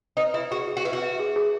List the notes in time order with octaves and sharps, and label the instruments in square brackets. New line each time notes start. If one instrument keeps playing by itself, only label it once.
[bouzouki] D#4 [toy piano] B4
[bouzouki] E4 [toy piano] E5
[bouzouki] F#4 [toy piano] G#4
[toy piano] G#4
[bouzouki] F#4
[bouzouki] E4 [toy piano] B4
[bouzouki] F#4
[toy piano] E5
G#4
G#4